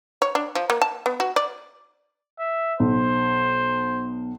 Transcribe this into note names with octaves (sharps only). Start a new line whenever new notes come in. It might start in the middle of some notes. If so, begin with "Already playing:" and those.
C#5
D4
F3
A#3
A5
B3
F#4
D5
E5
B1 C5